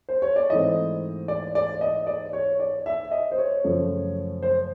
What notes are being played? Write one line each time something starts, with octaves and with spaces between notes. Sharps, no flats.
C5
C#5
D5
G#2 E3 A3 C4 D#5
D5
D5
D#5
D5
C#5
D5
E5
D#5
C5
C#5
F#2 C#3 F3 A3
C5